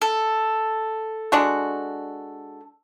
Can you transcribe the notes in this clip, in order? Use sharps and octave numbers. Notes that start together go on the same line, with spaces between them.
A4
G#3 D4 F#4